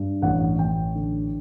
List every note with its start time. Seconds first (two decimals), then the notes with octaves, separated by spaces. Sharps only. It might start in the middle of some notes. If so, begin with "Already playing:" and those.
Already playing: G2
0.22 A1 F#5
0.59 A1 G5
0.95 D3